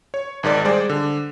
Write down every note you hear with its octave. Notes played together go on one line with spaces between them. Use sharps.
C#5
G#1 G#2 A#4 D5
G3 G#3 G#4 C5 D5
D3